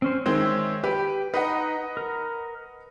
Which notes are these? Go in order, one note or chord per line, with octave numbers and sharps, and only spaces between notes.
C4 C#4 C5
D#3 G#3 C4 C#5 E5 C6
G4 B4 G5
D#4 B4 D#5 F#5
A#4